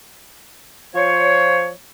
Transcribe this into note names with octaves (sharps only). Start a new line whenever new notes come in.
F3 F4 C5 C#5